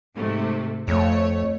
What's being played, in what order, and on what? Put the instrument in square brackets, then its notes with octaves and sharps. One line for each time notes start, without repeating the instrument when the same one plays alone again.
[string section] G#2 C3 A3
[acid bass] F2 [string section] A3 C#5